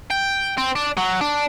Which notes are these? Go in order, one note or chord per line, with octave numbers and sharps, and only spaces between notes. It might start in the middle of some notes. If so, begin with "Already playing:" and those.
G5
C4
D4
F#3
D4